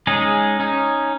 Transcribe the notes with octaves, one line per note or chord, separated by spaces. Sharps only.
G#3 C#4 D#4 G#4
C#4 D#4